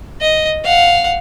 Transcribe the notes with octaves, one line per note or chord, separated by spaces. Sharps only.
D#5
F5 F#5